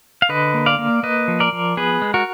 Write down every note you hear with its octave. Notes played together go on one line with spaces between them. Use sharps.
F5
D3 B4 D#5
A#3
D5 F5
A#3
A#3 B4 D#5
F3
A#4 D5
F3
B3 G#4 B4
G#3
F#4 A#4